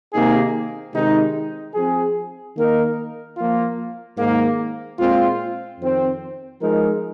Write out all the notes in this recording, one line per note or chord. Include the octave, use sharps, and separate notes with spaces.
C3 D#3 A#3 D#4 G#4
C3 D#3 G#3 D#4
F3 C4 G#4
D#3 A#3 D#4 A#4
F3 A#3 F4
G#2 D#3 A#3
A#2 G#3 C4 F4
F2 D#3 C4
F3 G#3 D#4 A#4